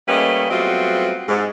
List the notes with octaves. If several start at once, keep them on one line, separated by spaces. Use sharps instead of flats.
G3 A3 A#3 C#4 B4 D#5
F#3 G3 A3 B3 C4 F4
G#2